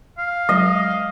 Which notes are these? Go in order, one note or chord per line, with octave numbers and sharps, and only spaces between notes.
F5
F#3 G#3 D#5